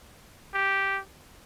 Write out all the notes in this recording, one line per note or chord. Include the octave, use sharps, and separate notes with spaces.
G4